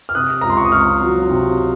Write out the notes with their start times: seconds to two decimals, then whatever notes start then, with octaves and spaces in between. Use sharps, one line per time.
0.09 F6
0.15 C3 D#6 F#6
0.41 C#2 A#5
0.50 C6
0.57 C#6
0.65 D#6
0.72 C#2 C#6 F6
1.01 F#3
1.29 C3